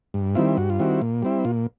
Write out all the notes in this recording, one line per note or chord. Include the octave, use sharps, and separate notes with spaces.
G2
D#3 G3 C4 E4 F4
G2 F#4
F4
D#3 G3 C4 E4 F#4
A#2
G3 C4 E4
A#2 F4